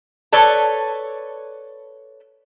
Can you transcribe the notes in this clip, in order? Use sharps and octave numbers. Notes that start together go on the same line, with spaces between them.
A4 B4 C#5 D5 A5